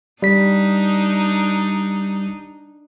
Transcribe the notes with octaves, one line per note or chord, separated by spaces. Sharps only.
G3 D4 D#4 B6